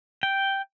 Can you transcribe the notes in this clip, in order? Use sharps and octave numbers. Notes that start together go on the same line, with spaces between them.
G5